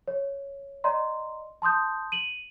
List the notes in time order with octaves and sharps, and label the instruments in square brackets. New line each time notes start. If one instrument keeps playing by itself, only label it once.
[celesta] C#5
D5 D#5 A#5 C6
A5 C6 D#6 G6
D#7 F#7